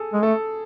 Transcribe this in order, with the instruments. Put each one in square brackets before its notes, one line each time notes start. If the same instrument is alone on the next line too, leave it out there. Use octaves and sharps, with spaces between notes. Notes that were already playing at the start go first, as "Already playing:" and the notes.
Already playing: [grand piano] G#4 A4
[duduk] G#3
[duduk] A3 [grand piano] A4